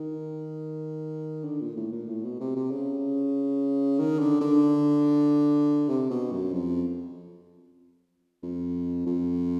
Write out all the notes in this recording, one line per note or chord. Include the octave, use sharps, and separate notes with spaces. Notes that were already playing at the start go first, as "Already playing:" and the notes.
Already playing: D#3
D3
A#2
A2
A#2
A2
B2
C3
C3
C#3
D#3
D3
D3
C3
B2
F#2
F2
F2
F2